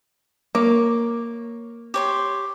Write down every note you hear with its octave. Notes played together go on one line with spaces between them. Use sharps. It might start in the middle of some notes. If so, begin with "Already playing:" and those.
A#3 C#5 D6
G4 C#5 C6